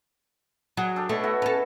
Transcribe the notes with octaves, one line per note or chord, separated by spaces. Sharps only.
F#3 G#4
D4 A4 G5
B2 A3 C#5
B2 E4 F#4
C#4 A4